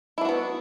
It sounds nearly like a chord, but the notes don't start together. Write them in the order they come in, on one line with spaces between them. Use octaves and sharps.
E4 D4 F#4 B3